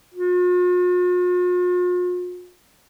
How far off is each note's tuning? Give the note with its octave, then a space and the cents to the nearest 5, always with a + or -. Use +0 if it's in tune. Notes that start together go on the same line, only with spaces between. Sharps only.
F4 +45